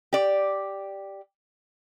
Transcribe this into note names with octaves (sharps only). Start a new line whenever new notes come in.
G4 D5